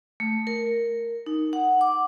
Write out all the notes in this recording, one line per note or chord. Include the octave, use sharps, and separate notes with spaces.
A3
A#4
D#4
F#5
D6